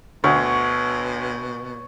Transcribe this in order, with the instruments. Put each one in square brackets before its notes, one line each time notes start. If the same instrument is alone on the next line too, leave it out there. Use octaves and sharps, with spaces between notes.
[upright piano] D2 [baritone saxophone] B2 [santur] C#5